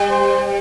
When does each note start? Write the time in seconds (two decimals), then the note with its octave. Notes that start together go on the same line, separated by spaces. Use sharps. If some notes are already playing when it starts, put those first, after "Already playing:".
Already playing: G3
0.10 C5